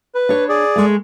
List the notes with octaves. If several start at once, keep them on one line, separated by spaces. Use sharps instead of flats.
B4
D4 C#5
G#4 D5
G#3 A3